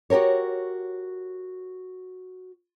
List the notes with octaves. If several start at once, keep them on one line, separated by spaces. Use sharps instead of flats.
F#4 G4 A4 A#4 C#5